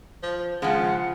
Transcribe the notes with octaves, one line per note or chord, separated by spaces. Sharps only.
F3
C#3 F3 G#3 F#5